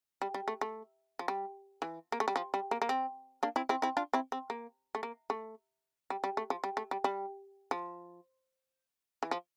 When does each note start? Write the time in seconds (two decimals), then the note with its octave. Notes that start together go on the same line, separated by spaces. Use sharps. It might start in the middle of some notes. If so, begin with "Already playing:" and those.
0.22 G3
0.34 G3
0.48 A3
0.61 A3
1.19 F3
1.28 G3
1.82 E3
2.12 A#3
2.20 A3
2.28 G3
2.36 F3
2.54 G3
2.71 A#3
2.82 A#3
2.89 C4
3.43 A#3 D4
3.56 C4 E4
3.69 C4 E4
3.82 C4 E4
3.97 D4 F4
4.13 C4 E4
4.32 C4
4.50 A#3
4.95 A3
5.03 A#3
5.30 A3
6.10 G3
6.24 G3
6.37 A3
6.50 F3
6.64 G3
6.77 A3
6.91 G3
7.04 G3
7.71 F3
9.23 E3
9.31 F3